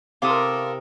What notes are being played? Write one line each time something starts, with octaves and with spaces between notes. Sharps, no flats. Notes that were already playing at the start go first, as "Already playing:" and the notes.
C3 E4 A4 A#4 F5 C6 D6 D#6